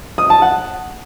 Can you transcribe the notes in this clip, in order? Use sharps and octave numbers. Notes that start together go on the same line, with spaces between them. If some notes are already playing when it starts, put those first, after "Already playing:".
D#6
A5
F#5